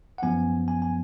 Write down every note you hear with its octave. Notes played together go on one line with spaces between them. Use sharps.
F#5
F#2 F3 B3 G#5
G#5
G#5